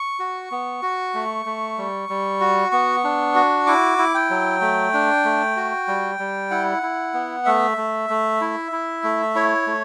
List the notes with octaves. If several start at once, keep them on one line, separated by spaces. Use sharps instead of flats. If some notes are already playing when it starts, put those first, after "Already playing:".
Already playing: C#6
F#4
B3
F#4
A3
A3
G3
G3
F#4
B3 C#6
D4
F#4
E4 D6
E4
G5
F#3
A3
D4
A3
F#4
G3
G3
E4 F#5
E4
B3
A3 E5
A3
A3
E4
E4
A3
E4 C#5
A3